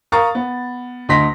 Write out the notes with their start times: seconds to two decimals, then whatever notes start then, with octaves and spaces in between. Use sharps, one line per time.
0.12 A#4 F5 A#5 C#6 D#6 A6
0.35 B3
1.09 D2 D#5 C6 A#6 B6